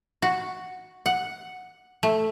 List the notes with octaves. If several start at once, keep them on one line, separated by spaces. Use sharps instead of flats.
F#4
F#5
A3